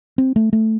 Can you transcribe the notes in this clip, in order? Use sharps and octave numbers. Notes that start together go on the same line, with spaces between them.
C4
A3
A3